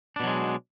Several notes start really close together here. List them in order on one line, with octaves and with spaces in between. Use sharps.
D4 B2 F#3 G#3